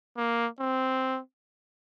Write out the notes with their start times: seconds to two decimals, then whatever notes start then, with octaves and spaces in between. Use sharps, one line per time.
0.17 A#3
0.60 C4